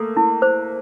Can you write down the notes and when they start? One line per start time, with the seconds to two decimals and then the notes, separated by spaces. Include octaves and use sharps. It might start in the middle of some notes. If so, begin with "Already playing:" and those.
Already playing: A3 A#3 A4
0.17 E4
0.42 C5